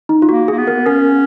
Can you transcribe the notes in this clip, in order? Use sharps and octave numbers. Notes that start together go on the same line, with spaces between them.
D#4
F4
A#3 F#4
A#3 G#4
B3
A#4
C#4 A#4